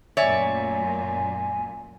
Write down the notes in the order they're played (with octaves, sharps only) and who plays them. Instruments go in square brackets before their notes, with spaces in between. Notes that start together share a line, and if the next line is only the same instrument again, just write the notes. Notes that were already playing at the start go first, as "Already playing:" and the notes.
[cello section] F#2 A#2 A3 [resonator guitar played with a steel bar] C#5 D5 E5 [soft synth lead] G#5